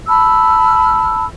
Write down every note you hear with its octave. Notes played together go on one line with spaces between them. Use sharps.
A5 B5 E6 F6